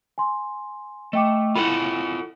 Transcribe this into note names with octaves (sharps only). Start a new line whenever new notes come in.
G#5 C6
A3 D#5 G5 D6
E4 F4 A4 F#5 B5